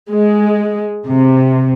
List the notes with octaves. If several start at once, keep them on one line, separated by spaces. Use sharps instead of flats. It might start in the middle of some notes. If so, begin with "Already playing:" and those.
G#3
C3